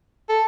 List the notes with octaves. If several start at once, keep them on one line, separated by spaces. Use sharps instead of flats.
A4